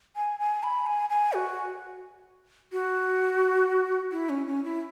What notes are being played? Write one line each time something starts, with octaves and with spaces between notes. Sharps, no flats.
G#5
G#5
B5
G#5
G#5
F#4
F#4
E4
C#4
C#4
E4